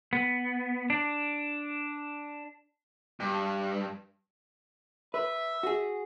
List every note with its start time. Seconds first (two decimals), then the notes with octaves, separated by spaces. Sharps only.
0.13 B3
0.90 D4
3.20 G2
5.14 B4 E5
5.63 F#4 G#4